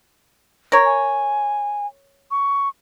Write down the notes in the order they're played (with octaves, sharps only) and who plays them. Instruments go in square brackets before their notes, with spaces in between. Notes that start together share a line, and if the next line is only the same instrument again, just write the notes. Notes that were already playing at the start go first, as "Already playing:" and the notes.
[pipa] A#4 C#5
[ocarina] G#5
C#6